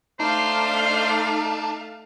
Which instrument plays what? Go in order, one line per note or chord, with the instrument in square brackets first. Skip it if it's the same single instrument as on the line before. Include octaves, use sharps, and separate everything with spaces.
[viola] A3 F5 [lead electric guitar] D4 [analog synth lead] D#4 [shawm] C5